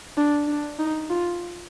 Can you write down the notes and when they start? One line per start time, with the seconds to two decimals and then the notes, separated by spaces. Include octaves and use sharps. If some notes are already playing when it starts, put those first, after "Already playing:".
0.18 D4
0.48 D4
0.79 D#4
1.10 F4